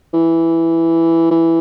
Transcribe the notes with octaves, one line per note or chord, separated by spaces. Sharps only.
E3
E3